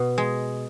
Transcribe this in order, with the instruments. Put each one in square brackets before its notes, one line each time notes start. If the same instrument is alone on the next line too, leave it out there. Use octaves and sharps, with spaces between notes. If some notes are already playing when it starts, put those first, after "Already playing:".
Already playing: [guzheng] B2
G#3